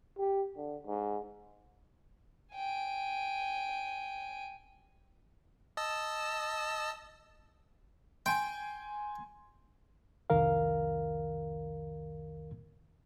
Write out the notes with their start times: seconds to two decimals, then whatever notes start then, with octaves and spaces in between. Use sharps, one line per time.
0.18 G4
0.57 D3
0.87 G#2
2.55 G5 G#5
5.77 D#5 A5 E6
8.26 G5 G#5 C6
10.30 C2 F2 D#3 A#4 F5